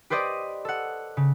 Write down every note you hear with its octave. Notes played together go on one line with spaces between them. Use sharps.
G4 B4 C5 D5 D#5
A4 F#5
C#3